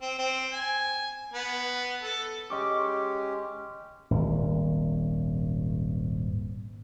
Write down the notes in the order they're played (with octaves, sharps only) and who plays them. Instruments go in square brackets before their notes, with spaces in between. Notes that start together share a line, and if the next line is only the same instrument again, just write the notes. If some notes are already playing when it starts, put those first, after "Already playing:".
[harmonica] C4
C4
G#5
B3
A4
[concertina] G#3 C#4 G4 [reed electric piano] D#5 C#6 D6
[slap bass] D#1 G#1